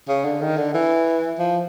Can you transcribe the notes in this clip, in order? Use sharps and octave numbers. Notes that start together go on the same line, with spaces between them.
C#3
D3
D#3
D3
E3
F3